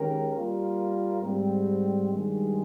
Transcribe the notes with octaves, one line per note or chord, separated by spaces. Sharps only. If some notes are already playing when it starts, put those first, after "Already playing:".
Already playing: D#3 G#3 C#4 G4 A#4
G3 A#3 F4 A#4
G#2 G3 C4
G2 D#3 G#3